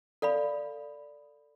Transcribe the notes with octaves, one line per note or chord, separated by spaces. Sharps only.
A4 D5 F5 B5